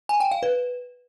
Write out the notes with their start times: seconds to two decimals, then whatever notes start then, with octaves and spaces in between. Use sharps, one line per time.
0.09 G#5
0.20 G5
0.31 F5
0.43 B4